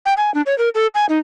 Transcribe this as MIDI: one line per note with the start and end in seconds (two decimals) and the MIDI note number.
0.06 0.14 79
0.17 0.33 80
0.34 0.41 62
0.46 0.57 73
0.58 0.69 70
0.75 0.87 69
0.95 1.06 80
1.09 1.19 63